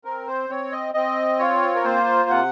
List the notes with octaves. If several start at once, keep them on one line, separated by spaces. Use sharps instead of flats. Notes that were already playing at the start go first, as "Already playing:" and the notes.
C4 A#4
C5
C4 C#5
D#5
C4 D#5
F4 C#5
A#4
A#3 C5
C3 F#5